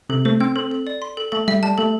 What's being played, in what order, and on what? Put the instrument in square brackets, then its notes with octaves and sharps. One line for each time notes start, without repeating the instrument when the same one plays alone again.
[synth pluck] C3 [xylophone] A4
[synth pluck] A3 [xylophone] C5
[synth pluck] C4 [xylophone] G5
[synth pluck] C4 [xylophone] A4
[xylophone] A4
D5
C6
A4
[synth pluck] A3 [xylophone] A4
[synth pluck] G3 [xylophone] E5
[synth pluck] G3 [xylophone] A5
[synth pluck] A3 [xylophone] A4